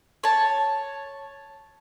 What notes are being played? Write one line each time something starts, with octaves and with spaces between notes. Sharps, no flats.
C#5 A5